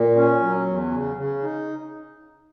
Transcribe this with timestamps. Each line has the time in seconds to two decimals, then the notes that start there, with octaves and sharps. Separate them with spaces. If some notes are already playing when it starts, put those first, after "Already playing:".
Already playing: A#2
0.16 C#4
0.41 F#3
0.66 E2
0.91 C#3
1.16 C#3
1.42 D#4